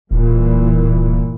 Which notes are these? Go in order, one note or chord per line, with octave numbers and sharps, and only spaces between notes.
D1 G2 A#2 E3